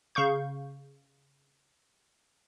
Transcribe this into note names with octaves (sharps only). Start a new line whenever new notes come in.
C#3 F5 C#6 G6